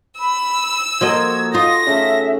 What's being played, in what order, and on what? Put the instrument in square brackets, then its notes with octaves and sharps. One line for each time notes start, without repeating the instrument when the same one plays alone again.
[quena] B5 [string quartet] E6
[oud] F3 A#3 D#5 [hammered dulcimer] F#4 A4 A#5 [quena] G#6
[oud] D#4 F4 [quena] D#6 [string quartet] A#6
[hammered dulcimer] C#3 A3 [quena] E5